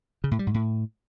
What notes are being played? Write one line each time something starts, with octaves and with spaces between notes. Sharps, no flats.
C#3
A2
G3
G#2
A2